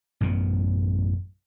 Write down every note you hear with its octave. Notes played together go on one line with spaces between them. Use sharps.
A1 F#2 B2 B3